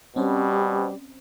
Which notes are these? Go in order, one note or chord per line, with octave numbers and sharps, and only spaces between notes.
B2 G3 C4 C#4 C5